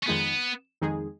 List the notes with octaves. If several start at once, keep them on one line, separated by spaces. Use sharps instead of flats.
C#4
F2 D#3 G#3 B3 D#4 G#4
F2 D#3 G#3 D#4 G#4